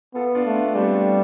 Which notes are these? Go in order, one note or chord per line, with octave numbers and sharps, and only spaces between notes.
B3 F4 A4
D4 F4
A3
B3 D4
G3 A3 C4